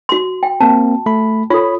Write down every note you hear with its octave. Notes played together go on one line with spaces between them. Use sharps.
F#4 C6
G5
A#3 C4 A5
A3 B5
F4 A4 C#5 B5